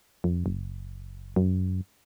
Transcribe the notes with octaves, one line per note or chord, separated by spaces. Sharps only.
F2
F#1
F#2